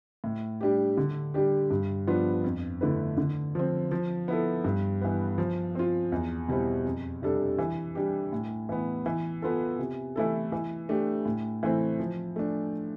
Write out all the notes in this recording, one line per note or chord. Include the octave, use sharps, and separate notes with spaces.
A2
G3 D4 G4
D3
G3 D4 G4
G2
F3 B3 D4 F4
F2
D3 A3 E4 B4
D3
F3 C4
F3
B3 E4 A4
G2
E3 B3
F3
C4 F4
E2
B2 G3 C4 E4
F2
C3 G3 D4 A4
E3
G3 D4 G4
A2
E3 B3
E3
B3 F4 A4
C3
E3 A3 E4 A4
E3
A3 D4 G4
A2
E3 A3 C4 E4
F3
A3 D4